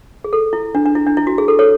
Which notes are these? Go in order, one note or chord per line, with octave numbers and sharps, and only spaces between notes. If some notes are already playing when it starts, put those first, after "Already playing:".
G#4
A4
E4
D4
D4
E4
D4
E4
F#4
G#4
A4
A4 C#5